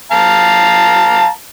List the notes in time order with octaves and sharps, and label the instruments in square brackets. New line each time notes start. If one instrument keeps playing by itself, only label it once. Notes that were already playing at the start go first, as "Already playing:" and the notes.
[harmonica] F5 A5 A#5